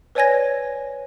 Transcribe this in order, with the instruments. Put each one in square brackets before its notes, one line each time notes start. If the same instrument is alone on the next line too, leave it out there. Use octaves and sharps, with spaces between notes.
[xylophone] B4 C#5 D5 G#5 G#6 A#6